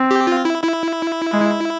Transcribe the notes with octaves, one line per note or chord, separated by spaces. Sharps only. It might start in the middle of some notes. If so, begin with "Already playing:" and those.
Already playing: C4
G4
F4
E4
E4
G#3